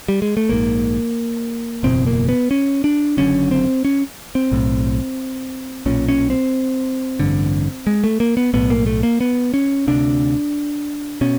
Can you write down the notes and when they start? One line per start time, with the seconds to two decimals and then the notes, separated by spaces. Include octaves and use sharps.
0.08 G3
0.22 G#3
0.37 A3
0.49 A#1 G#2 A#3
1.83 F#1 E2 B2 C4
2.06 A#3
2.29 B3
2.51 C#4
2.84 D4
3.17 F#1 F#2 D3 C#4
3.51 C4
3.85 C#4
4.35 C4
4.52 B1 A2
5.86 B1 A#2 C#4
6.09 C#4
6.30 C4
7.20 A1 G2 D3
7.87 G#3
8.04 A3
8.20 A#3
8.37 B3
8.54 B1 A2 B3
8.70 A#3
8.87 A3
9.03 A#3
9.21 B3
9.54 C#4
9.88 D2 C3 D4
11.21 B2 C#4